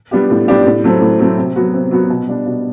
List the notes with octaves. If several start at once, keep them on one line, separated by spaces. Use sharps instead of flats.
G3 B3 D4 G4
A2
G3 B3 D4 G4
A2
F#3 A3 C4
A2
F#3 A3 C4
C3
F#3 B3 F#4
C3
F#3 B3 F#4
B2
G3 D4
B2